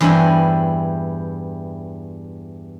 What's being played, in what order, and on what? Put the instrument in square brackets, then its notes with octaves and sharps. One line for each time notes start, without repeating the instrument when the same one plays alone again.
[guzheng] E2 G2 C4 E4 G#5